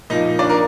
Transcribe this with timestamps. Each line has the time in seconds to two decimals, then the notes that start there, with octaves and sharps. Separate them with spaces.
0.10 A#2 F3 A#3 D#4 D#5
0.39 D4 D5
0.49 A#4